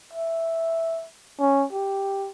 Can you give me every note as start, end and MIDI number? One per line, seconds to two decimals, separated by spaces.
0.13 1.06 76
1.40 1.65 61
1.73 2.30 67